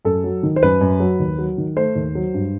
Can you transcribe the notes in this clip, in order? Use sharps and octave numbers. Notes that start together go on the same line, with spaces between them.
F#2 A4
F#3
D#3
C5
F#2 B4
F#2
F#3
D#2
F#3
D#3
A3 C5
D#2
F#3
G2